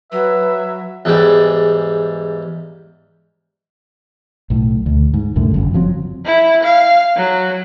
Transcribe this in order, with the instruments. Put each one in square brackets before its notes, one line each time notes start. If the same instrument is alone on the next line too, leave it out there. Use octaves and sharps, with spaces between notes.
[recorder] F#3 [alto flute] B4 [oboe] E5
[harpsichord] E2 G#2 G3
[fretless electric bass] B1 A2
D2
G#2
C2 F#2 A2 D3
G1 F#2
F#1 F3 F#3 C4
[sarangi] E4
F5
F#3